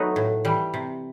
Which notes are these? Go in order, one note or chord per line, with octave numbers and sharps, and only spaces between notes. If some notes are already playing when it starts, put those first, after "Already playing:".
Already playing: F#3 A3 B3 D#4
A2
E3 G3
C3